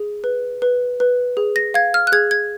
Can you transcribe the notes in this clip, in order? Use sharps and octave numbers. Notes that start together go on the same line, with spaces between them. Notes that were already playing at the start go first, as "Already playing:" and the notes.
Already playing: G#4
B4
B4
B4
G#4
A#6
F5 G#6
F6
F#6
G#4 G#6
G#6